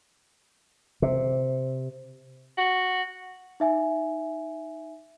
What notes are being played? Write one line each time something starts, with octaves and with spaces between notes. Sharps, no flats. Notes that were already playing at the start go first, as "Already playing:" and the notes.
C3
F#4
D#4 E5 G#5